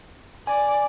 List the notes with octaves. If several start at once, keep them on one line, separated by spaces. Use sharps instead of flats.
D5 G#5